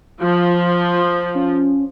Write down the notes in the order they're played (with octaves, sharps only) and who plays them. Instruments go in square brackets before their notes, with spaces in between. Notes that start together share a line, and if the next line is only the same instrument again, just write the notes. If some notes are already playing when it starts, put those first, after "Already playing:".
[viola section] F3 [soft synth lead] F4
[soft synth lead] C#4